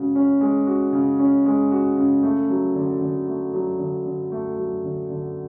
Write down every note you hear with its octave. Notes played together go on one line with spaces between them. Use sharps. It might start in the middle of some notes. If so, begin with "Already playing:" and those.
Already playing: C#3 G#3 C#4 F#4
C#4
G#3
F#4
C#3
C#4
G#3
F#4
C#3
A3
F#3
D3
D3
A3
F#3
D3
D3
A3
F#3
D3
D3